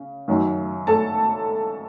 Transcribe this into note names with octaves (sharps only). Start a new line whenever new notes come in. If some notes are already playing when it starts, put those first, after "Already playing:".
Already playing: C#3
F#2 D#3 F#3
A4 A5